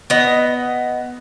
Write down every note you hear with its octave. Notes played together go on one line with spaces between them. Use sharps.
B3 D#5